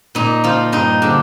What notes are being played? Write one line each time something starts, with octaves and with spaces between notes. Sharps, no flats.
A#2 D#4
F3 F4
G2 D#4
D3 F3 D4